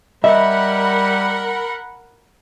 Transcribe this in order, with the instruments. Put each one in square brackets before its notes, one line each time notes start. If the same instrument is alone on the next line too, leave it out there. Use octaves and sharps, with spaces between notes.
[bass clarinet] G3 [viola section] A#4 F#5 B5 [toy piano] D#5 [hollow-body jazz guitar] E5